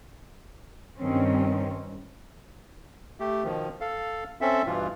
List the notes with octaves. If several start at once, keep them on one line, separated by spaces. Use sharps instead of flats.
G2 D#3 C4 C#4
A3 G4
B2 D#3 F3
A4 F5
C4 C#4 A4 E5
G2 B2 E3 F4